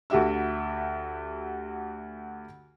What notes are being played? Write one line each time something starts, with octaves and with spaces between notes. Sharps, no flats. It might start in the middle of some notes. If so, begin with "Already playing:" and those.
D2 F#4 G4 E5 E6